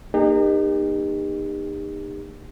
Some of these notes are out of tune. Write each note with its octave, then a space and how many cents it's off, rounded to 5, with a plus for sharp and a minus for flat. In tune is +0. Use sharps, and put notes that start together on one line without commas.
A#3 +20 D#4 -25 G4 +40